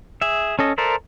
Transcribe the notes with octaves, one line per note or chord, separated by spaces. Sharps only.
G#4 E5
C#4 A4 D#5
A4 A#4 C5 D5 E5